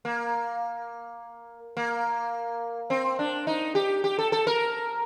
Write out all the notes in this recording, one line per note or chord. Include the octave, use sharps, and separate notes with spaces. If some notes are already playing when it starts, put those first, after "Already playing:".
A#3
A#3
C4
D4
D#4
G4
G4
A4
A4
A#4